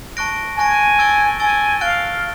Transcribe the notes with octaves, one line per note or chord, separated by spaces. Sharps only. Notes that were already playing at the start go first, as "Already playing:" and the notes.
A5 C#6 F#6 A#6 D7
G#5 A5 C#6 F#6 A#6 D7
E6 A6 D7 G7
G#5 E6 A6 D7 G7
F5 F#6 A6 D7 G7